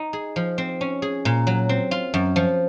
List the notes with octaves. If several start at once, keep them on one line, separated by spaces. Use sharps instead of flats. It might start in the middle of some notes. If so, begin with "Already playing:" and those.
Already playing: D#4
G#4
F3
C4
C#4
G#4
A#2
F#3
C4
F4
F#2
F3